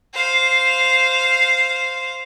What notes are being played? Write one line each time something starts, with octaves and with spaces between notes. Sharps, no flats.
C5 F5